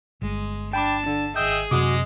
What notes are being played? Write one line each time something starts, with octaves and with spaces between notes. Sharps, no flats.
G1 G#3
D4 G5 A5 B5 D6
D3 D4
G#1 G#4 D#5 E5 G5 D#6 G6
F#2 C3 G#3 F#4 D#5 D6